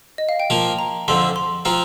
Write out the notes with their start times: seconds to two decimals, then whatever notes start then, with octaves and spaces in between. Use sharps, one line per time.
0.18 D#5
0.29 F5
0.40 G5
0.50 F3 A#3 F4 A5
0.79 A#5
1.08 F2 D3 F3 C4 C6
1.36 C6
1.65 F3 C4 F4 A#5